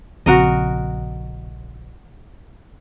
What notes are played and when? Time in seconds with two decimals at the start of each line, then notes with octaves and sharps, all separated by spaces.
0.26 A#1 C#3 C4 F#4 A#4 D#5